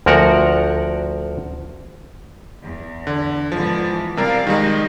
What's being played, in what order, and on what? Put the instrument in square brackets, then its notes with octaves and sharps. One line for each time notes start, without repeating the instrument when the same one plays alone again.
[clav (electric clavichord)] D2 F3 F#4 A#4 F#5
[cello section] E2
[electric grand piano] D3
[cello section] G#2 D3 B3 [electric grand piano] F3
[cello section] E3
[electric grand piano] C3 G3 A#4 [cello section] D5 F5
[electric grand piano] D#3 G3 G#3 [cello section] D#4